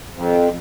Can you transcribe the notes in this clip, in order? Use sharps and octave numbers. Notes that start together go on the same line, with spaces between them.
F2